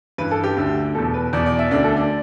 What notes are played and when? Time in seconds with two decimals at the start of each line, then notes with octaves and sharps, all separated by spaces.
0.18 G2 E3 B4
0.31 A4
0.44 G4
0.57 D2 D3
0.95 E2 B2 A4
1.14 B4
1.33 E2 B2 D5
1.46 D5
1.59 E5
1.71 D2 D3 D5
1.84 A4
1.97 D5